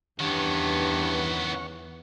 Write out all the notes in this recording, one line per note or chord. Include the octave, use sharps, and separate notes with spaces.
E2 G2 D#3 E3 B3 C#4 F#5 C#6